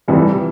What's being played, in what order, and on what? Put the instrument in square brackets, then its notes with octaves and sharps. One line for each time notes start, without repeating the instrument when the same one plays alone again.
[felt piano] F1 F2 E3 G3